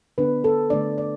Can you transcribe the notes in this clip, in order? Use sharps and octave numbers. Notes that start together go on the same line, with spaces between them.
D3 B3 D4 B4
A4
D3 A3 D4 D5
D5